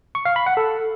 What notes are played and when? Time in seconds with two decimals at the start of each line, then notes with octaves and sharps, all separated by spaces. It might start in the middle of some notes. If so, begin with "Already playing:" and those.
0.15 C#6
0.25 F5
0.36 B5
0.46 F#5
0.57 A4